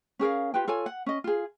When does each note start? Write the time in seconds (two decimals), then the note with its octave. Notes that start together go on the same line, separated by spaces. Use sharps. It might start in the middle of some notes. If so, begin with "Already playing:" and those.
0.19 C#4 G#4 A#4 F5
0.54 F4 G4 B4 G5
0.68 F4 A4 C#5 G#5
0.86 F#5
1.06 C#4 D#5
1.24 F4 G#4